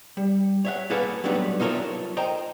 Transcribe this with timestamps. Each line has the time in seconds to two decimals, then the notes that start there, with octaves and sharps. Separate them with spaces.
0.17 G3
0.65 C#5 E5 F#5
0.90 A#3 G#4 A4 B4 F5 F#5
1.24 F#3 G3 A3 B3 D4 D#4
1.60 D#4 F4 A4 A#4 C#5 E5
2.17 C5 D#5 G5 A#5